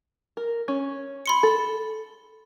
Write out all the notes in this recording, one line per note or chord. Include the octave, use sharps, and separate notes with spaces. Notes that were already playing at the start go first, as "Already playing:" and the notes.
A#4
C#4
B5 C6 C#7
A4